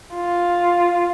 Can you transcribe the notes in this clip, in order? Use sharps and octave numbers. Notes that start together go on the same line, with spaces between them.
F4